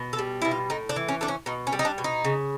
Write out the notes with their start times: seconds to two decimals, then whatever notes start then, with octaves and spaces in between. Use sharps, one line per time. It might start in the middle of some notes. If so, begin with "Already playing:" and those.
Already playing: B2
0.13 A4
0.19 G3
0.42 B2 E4
0.51 F4
0.70 A2 D#4
0.89 D4
0.96 E3
1.08 C#4
1.21 A3 D4
1.28 C#4
1.46 B2 D#4
1.67 C#4
1.72 G3
1.79 D#4
1.85 D4
1.98 B2
2.04 D#4
2.25 C#3